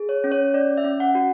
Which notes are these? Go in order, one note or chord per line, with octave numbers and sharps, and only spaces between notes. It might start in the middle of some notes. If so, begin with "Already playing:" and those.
Already playing: G#4
C#5
C#4
C#5
C#4 D5
E5
C#4
F#5
F#4